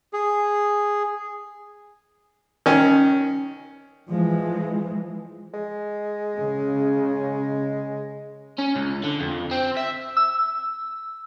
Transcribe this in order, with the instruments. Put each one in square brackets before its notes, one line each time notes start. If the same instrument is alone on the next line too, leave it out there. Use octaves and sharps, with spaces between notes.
[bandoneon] G#4
[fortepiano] D#3 C#4
[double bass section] E3 F3 G#3
[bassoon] G#3
[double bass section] C#3
[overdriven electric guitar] C#4
C#2
D3
F2
C4
E5
[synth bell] E6